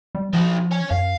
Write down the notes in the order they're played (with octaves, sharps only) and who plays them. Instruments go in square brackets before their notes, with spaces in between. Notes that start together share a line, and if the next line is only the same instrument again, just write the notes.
[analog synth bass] G3
[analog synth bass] F3 [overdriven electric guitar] D#4 F#4
[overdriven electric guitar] C#5 G#5
[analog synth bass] F#2 [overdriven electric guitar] F5